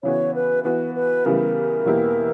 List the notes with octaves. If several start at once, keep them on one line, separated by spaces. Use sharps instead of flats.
C#3 E3 B3 F#4 C#5
B4
E3 B3 F#4 B4
B4
C#3 E3 G3 B3 A#4
E2 B2 A#3 E4 G4